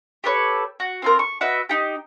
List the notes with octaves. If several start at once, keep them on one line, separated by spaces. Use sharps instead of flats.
G4 A4 B4 C#5
F#4
C4 F4 A#4
C#6
F#4 B4 D#5 E5
D#4 G4